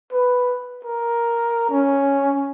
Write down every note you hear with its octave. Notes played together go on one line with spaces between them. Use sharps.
B4
A#4
C#4